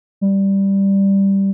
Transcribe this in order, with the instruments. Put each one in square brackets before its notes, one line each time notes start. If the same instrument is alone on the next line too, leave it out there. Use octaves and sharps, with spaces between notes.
[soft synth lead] G3